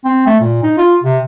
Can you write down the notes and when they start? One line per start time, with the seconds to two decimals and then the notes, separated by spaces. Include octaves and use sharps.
0.05 C4
0.26 A3
0.40 A#2
0.63 D#4
0.78 F4
1.04 C3